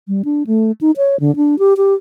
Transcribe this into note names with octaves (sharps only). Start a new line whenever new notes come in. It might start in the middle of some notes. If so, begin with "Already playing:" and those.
G3
D4
A3
D#4
C#5
D3
D4
G4
G4